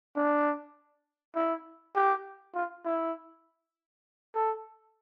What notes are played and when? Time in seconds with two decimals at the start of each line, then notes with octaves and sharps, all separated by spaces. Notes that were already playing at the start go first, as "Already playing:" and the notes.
0.16 D4
1.36 E4
1.96 G4
2.55 F4
2.85 E4
4.35 A4